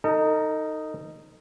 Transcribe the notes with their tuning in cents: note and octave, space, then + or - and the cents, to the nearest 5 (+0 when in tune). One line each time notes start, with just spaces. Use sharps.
D#4 +0 A4 +40